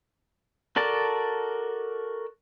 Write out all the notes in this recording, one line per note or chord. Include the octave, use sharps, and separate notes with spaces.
F#4 A4 A#4 D5 A5